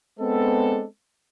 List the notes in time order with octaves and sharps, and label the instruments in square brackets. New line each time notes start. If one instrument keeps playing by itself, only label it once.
[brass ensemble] G#3 B3 C4 D4 A4